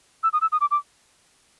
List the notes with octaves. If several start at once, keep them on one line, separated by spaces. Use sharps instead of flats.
E6
D#6
E6
D#6
D6
D6